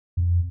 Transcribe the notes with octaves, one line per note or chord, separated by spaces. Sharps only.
F2